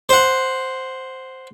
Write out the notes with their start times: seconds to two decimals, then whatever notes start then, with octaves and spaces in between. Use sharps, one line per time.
0.09 C5 F#5